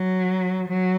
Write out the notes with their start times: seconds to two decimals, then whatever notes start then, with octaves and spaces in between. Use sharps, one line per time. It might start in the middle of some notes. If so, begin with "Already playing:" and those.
Already playing: F#3
0.68 F#3